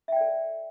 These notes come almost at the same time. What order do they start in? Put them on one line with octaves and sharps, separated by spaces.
E5 G5 D5 A4